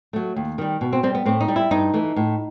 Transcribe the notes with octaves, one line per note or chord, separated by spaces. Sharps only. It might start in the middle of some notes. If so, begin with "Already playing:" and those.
F#3 A3
D#2
D#3 G3
B2
C4
G3 C4
B3
A2 C4
D#4
G3
E4
G2 D#4
E3 A3
A2